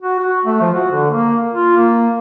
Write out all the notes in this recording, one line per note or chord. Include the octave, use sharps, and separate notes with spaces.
F#4
F#4
A3
F3
F#4
D3
A#3
F4
A#3